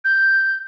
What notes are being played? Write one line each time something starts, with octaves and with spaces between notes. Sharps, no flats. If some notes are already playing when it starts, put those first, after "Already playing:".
G6